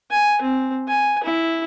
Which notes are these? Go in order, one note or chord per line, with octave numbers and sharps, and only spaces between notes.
G#5
C4
G#5
E4